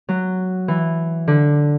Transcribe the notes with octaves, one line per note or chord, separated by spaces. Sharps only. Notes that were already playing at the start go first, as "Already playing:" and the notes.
F#3
E3
D3